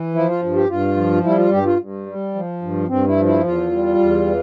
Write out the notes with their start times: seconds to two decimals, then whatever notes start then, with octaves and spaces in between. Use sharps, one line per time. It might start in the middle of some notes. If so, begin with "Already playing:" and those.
Already playing: E3
0.14 F3 E4
0.28 F4
0.42 G2
0.56 G4
0.69 G2 F4
0.97 F3
1.24 G3 E4
1.37 F4
1.51 G2 G4
1.66 F4
1.80 G2
2.06 G3
2.35 F3
2.62 G2
2.89 G2 C4
3.08 E4
3.17 F3
3.25 E4
3.44 E2 F4
3.71 G3
3.99 E2
4.27 E3